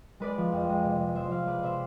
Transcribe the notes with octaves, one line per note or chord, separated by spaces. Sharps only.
G#3 B4 D5
F3
F2
G#3
C3
G#3
F3 C5 E5
F3 D5 F5
G#3 B4 D5
C3 C5 E5